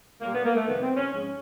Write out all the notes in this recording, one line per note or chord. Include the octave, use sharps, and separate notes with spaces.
A#2 G3 A#3
B3
A#3
A3
F2 C3 D#3 G3 B3
C4
C#4
G#2 F3 G#3 C#4